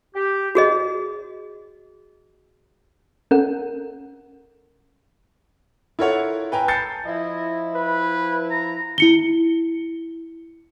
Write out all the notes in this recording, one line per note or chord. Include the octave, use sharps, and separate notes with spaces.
G4
F#4 G#4 D#5
C#4 A4 A#4 F#5
E4 F4 A4 A#4 C#5 F#5
B4 G5 G#5 A#5
A5 B5 G6 A6 C7 C#7
F3 E4 D#5
B4
A#5
E4 C#7 G7